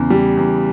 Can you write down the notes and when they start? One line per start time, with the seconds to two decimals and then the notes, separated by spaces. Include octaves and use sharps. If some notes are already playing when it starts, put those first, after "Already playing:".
Already playing: E2 C#3
0.10 G3
0.37 E2